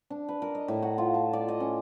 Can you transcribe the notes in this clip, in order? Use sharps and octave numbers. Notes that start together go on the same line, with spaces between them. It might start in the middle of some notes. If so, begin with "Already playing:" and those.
D4
B4
A#4
D#5
A2
F#4
F4
A5
D5
D#5
C#4